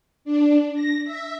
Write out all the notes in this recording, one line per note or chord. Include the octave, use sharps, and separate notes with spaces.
D4
A#6
E5